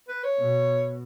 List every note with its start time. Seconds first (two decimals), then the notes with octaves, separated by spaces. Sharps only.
0.08 B4
0.24 C#5
0.38 B2